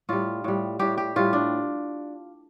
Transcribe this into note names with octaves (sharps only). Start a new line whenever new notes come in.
A2 G3 F4
A2 G3
A2 G3 G4
G4
A2 G3 F4
D4